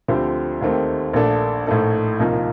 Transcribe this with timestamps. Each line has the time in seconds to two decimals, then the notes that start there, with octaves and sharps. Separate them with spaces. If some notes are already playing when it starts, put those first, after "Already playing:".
0.08 D2 D3 F3 C4 G4
0.61 D#2 D#3 A3 C4 G4
1.13 A#1 A#2 A3 D4 A4
1.67 A#1 A2 A3 D#4 A4
2.19 C2 A#2 F3 A#3 D#4